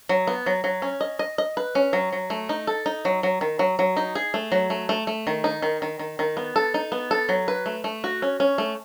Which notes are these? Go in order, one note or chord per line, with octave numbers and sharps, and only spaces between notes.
F#3
B3
F#3
F#3
C#4
D#5
D#5
D#5
B4
C#4
F#3
F#3
A3
D#4
A4
D#4
F#3
F#3
D#3
F#3
F#3
D#4
G#4
A3
F#3
A3
A3
A3
D#3
D#4
D#3
D#3
D#3
D#3
B3
A4
D#4
B3
A4
F#3
B4
A3
A3
F#4
C#4
C#4
A3